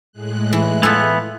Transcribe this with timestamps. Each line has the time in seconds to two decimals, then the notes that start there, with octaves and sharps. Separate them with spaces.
0.12 A2 G#3 F#6
0.53 E3
0.83 E3 B3 E4 F4 A4